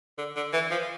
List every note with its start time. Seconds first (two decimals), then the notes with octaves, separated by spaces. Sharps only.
0.18 D3
0.36 D3
0.53 E3
0.71 F3